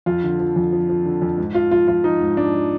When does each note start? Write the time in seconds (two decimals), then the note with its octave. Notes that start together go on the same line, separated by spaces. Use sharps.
0.06 F2 F4
0.23 D3
0.40 F3
0.56 F2
0.72 F3
0.89 F3
1.06 D3
1.22 F2
1.38 G#2
1.55 F3 F4
1.71 F3 F4
1.88 F3 F4
2.04 F3 D#4
2.20 G#2
2.37 G#2 D4
2.54 F3